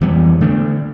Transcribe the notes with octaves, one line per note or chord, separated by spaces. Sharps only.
F2 E3 G3 B3
D3 A3 D4